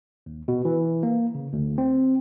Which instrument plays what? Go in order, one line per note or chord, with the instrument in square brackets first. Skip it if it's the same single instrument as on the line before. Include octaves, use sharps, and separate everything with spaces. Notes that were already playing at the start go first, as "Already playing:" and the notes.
[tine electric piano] D#2
B2
E3
A#3
C#3
D2
C4